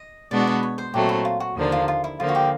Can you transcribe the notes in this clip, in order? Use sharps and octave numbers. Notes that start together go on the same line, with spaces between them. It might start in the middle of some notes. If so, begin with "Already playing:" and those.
Already playing: D#5
B2 G#3 B3 D4 F#4 D5
B4
C#5
C5
A#2 F#3 A3 C4 G4
E4
F4
F#4
D#2 D3 F3 A#3 D4
F4
F4
E4
D3 F3 A#3 F4
F#4
G4